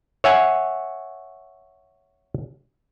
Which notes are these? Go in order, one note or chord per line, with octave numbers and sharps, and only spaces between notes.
C#5 E5 F#5 G#5